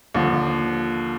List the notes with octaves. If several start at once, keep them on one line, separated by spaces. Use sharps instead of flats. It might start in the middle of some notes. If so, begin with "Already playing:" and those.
D#2 D3 F3